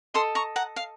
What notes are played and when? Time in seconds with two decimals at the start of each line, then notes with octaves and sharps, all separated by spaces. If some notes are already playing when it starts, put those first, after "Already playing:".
0.14 A4 D#5 C6 D#6
0.35 A#5 C#6
0.56 F#5 A#5
0.76 F5